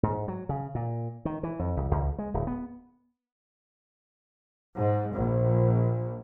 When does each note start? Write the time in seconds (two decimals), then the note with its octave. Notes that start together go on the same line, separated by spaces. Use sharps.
0.03 G#2
0.28 F#3
0.49 C#3
0.75 A#2
1.25 D#3
1.43 E3
1.59 F2
1.77 C2
1.91 C#2
2.19 G#3
2.34 D1
2.47 B3
4.76 G#2
5.15 A#1